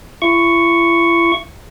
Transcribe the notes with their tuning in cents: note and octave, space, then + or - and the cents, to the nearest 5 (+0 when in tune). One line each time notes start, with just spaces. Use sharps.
E4 +40 C#6 +0